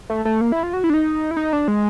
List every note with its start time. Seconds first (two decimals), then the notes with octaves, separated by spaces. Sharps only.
0.10 A3
0.25 A3
0.41 A#3
0.52 E4
0.63 F4
0.73 F#4
0.84 E4
0.90 D4
0.94 D#4
1.31 E4
1.37 D#4
1.53 D4
1.68 G#3